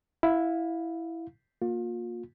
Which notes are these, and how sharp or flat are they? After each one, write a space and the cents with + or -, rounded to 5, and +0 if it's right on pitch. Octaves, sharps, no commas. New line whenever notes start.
E4 +0 F5 +20
A#3 +0 F4 +35